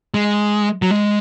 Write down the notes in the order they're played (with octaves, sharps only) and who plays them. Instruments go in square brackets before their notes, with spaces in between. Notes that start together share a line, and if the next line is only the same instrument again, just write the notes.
[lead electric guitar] G#3
F#3
G#3